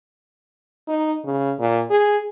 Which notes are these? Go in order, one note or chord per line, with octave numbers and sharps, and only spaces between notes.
D#4
C#3
A#2
G#4